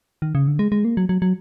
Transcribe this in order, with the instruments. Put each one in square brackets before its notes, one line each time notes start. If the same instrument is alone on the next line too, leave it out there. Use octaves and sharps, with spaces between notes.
[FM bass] D#3
C#3
D3
G#3
G#3
A#3
F#3
F#3
F#3